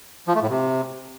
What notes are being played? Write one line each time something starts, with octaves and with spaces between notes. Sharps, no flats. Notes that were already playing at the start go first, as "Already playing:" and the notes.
F3
A3
A2
C3